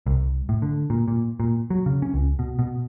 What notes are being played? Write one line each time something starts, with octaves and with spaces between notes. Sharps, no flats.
C2
A2
D3
A#2
A#2
A#2
F#3
C#3
C#4
C#2
B2
B2